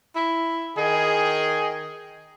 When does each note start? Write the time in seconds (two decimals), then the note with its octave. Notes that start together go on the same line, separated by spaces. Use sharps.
0.16 E4
0.77 D#3 G#4